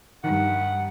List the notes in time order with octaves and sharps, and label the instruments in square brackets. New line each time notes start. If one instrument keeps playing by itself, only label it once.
[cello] G2 [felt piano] D#3 [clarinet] F#5